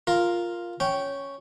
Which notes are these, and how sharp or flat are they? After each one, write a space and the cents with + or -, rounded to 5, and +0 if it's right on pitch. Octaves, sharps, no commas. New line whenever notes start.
F4 +0 A#4 +0
C#4 +0 G5 -15